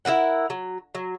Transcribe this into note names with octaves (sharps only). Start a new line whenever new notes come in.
E4 F4 A#4 F#5
F#3
F#3